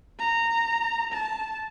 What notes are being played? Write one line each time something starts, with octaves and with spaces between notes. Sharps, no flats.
A#5
A5